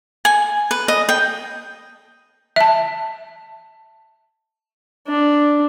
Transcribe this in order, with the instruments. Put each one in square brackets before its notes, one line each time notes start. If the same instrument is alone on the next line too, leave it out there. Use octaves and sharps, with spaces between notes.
[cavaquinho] G#5
B4
D#5
G5
[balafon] E5 A5
[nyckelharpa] D4